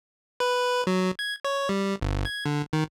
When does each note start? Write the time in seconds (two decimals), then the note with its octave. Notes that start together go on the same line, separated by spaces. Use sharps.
0.40 B4
0.87 F#3
1.19 G#6
1.45 C#5
1.69 G3
2.01 G1
2.25 G#6
2.46 D3
2.73 D#3